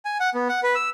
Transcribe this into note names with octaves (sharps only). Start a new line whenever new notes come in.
G#5
F#5
B3
F#5
B4
E6